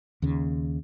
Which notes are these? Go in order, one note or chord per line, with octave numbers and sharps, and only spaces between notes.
D#2 C#3